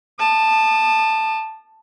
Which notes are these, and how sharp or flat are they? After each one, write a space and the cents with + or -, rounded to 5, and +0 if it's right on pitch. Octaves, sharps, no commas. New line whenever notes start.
A5 +0 D#6 -45